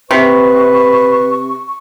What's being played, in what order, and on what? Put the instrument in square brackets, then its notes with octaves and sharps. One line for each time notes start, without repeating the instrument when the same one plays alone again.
[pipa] C3 [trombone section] B4 [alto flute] C#6